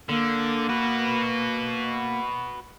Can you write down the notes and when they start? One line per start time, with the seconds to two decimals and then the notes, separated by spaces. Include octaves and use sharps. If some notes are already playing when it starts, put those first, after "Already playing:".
0.09 D3 A#3
0.69 F#4 B4